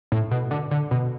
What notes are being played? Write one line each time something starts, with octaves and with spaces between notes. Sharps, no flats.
A2
B2
D3
D3
B2